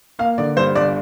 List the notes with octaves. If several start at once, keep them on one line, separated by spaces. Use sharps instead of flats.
A#3 F5
D3 D5
G2 C5
G1 D5